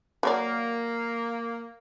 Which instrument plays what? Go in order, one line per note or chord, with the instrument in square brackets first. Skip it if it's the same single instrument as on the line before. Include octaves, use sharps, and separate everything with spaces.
[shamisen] F#3 C#5 D5 [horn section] A#3